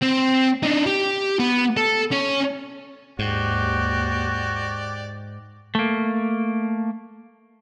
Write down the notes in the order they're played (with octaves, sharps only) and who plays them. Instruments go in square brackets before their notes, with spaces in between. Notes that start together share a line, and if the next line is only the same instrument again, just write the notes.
[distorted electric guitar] C4
D4 D#4
G4
B3
A4
C#4 C#5
[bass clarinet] D#2 [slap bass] G#2 [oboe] F#4 [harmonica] G4 D5
[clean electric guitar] A3 A#3